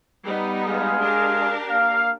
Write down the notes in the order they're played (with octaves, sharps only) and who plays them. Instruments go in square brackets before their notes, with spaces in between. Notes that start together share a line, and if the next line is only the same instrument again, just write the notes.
[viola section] G3 B3 D#4
[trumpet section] G#3 G#4 F5
[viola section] D4 G4 A#4
[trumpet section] A#3 F5